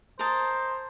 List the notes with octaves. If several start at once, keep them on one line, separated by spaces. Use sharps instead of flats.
A#4 C5 D#5 A5